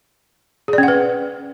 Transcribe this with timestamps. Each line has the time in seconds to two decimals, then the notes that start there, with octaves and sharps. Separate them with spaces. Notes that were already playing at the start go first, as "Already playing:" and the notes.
0.68 G#4
0.73 D5
0.78 C#4
0.83 F#5
0.88 B4